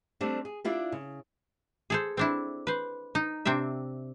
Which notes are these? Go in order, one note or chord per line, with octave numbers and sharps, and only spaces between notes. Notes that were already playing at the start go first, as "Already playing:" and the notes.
G3 A3 C4 D4
G#4
D4 E4 F4 G4
C#3
G#4 A4 C5
C4 D4 E4
B4 C5
D#4
C3 C4 D4 E5